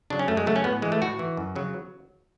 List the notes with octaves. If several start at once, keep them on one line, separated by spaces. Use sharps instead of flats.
C#3 F#3 D4
C#4
F#2 A3
G#3
C#3 F#3 A3
C#4
A2 B3
E3 G#3
A3
A2 F#4
E3
F#2
C#3 F#3